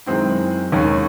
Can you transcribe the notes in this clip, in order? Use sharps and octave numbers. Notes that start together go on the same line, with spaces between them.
F#2 D#3 G#3 C4 E4
D#2 D#3 G#3 C#4